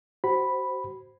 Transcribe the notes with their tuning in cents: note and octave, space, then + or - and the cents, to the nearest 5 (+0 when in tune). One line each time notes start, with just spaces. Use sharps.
F#4 +30 C5 +0 B5 +0